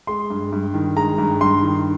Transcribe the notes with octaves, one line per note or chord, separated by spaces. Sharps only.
G#3 C6
G2
G2
D#3
G#3 A#5
G2
G2 C6
D#3